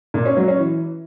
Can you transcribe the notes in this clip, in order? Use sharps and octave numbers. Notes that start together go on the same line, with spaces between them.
A#2
C#4
F#3
C#4
E3